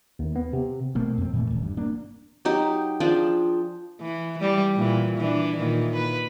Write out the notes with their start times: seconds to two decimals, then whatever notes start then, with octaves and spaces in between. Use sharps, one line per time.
0.19 D#2
0.36 B3
0.53 C3
0.95 B2 A3 A#3 C4
1.18 F2 C4
1.34 A#2 E3 A3
1.51 D#1
1.62 G2
1.77 A#3 D4
2.45 F#3 D#4 G4
3.00 F3 D4 G#4 G5
4.01 E3
4.39 E3 G3
4.75 A#2 E3
5.17 E3 D4
5.57 A#2 D#3 E3
5.96 B4